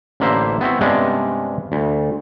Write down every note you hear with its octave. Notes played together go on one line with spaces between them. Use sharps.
A1 D3 A#3 E4 C5
B3 C4 E4 F#4
G2 C3 G#3 B3 C#4 D4
D2